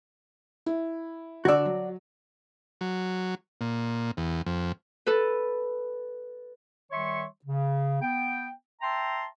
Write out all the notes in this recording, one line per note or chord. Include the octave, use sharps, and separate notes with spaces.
E4
D3 F#4 D5 E6
F#3
F#3
A#2
E2
F2
A4 B4
D#3 G3 C#5 E5 C6 C#6
C#3
B3 G5
E5 G5 A5 A#5 C6